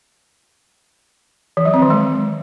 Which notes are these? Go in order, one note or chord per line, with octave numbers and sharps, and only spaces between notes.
E3
F#3
C4
D#3
G#3